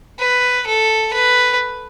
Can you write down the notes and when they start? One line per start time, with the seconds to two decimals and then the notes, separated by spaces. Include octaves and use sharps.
0.19 B4
0.67 A4
1.13 B4